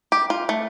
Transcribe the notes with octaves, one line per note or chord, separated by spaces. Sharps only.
G4
F4
A3